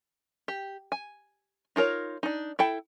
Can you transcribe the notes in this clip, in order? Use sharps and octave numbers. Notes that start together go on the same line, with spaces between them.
G4
G#5
D#4 F4 A#4 C#5
D4 D#4
E4 A4 G5